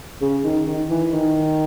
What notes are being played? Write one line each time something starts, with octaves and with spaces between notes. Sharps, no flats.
C#3
D#3
D#3
E3
D#3